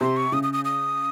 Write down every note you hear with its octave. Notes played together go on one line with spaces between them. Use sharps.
C3 C6
C#6
C#3 D#6
D#6
D#6
D#6